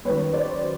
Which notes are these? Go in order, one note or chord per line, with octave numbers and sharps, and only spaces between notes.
F#2 D#3 F#3 B4 C#5
C5 D5